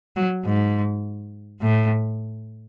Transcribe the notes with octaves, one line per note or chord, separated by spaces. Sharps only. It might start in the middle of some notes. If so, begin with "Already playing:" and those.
F#3
G#2
A2